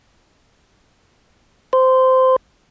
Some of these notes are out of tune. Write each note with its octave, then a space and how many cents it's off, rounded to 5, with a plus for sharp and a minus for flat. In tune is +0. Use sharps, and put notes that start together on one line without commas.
C5 -15